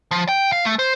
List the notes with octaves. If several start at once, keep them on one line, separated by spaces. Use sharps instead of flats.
F3
G5
F5
A3
C5